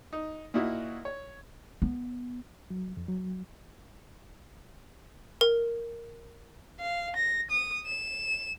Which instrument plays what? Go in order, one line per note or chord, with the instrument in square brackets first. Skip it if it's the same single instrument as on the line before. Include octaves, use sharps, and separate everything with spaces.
[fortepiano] D#4
A#2 D#4 E4 F#4 D#5
C#5
[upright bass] B3
[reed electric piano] F#3
F2
F#3
[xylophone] A#4
[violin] F5
A#6
D#6
E7